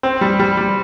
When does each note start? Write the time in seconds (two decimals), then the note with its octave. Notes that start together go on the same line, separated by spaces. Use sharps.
0.03 C4
0.21 G3
0.40 G3
0.57 G3